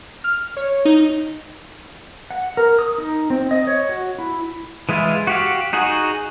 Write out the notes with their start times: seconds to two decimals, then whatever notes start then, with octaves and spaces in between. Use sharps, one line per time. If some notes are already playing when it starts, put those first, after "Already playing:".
0.24 F6
0.57 C#5
0.85 D#4
2.31 F#5
2.57 A#4
2.79 D#6
2.98 D#4
3.30 C4
3.51 D#5
3.67 C#5
3.89 F#4
4.19 E4
4.89 E3 G#3 E4 F4
5.27 F#4 G4 F5
5.73 D#4 F#4 G#4 F#5